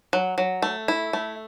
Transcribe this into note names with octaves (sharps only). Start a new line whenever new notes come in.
F#3
F#3
A3
E4
A3